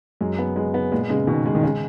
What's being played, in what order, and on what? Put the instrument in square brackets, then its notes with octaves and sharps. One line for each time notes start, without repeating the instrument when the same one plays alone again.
[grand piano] F#2 [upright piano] G#3
[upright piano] B3
G#3
B3
[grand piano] A#2 [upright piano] G#3
[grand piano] C#3 [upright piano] G#3
[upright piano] B2 [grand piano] D#3
[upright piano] G#3
[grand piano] D#3
[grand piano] C#3 [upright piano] G#3